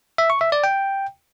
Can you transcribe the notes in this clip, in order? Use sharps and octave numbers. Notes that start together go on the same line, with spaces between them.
E5
C#6
E5
D5
G5